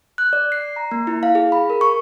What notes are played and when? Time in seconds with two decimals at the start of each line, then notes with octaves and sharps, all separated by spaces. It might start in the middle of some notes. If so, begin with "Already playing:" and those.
0.18 F#6
0.33 D5
0.52 C7
0.76 A#5
0.91 A#3
1.07 E4
1.23 F5
1.35 G#4
1.52 B5
1.70 A#4
1.81 C#6